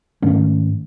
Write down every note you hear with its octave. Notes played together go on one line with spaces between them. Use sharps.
G#2 D#3 A3 C#4